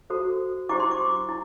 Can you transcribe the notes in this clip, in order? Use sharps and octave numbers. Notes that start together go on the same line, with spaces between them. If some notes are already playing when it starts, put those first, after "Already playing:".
F#4 A4 C5
E4 G4 C5 D6
C6
D6
E4